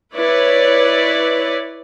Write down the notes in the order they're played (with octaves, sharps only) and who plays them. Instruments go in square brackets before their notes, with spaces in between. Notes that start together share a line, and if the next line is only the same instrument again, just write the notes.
[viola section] E4 B4 C#5 D5